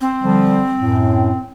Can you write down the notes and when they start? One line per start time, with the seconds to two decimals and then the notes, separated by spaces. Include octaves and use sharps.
0.01 C4
0.22 D3 F3 G3
0.79 F#2 A2